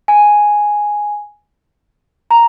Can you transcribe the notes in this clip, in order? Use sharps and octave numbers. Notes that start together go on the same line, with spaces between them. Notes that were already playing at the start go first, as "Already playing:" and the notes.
G#5
A#5